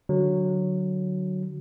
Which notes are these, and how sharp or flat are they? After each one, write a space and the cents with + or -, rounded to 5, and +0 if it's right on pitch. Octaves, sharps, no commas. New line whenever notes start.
D3 +5 F#3 +0